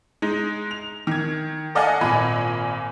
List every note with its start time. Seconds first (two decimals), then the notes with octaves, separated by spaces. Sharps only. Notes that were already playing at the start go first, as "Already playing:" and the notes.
0.22 G#3 D#4
0.71 F7
1.07 D#3 G#6
1.75 A4 D5 D#5 F5 F#5 G#5
2.01 G#1 A#2 G#5 B5